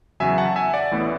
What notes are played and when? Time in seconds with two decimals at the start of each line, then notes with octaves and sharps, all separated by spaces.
0.20 E2 C#3 F#3 E5 G#5
0.38 F#5 A5
0.56 E5 G#5
0.73 D5 F#5
0.91 A1 A2 E3 B3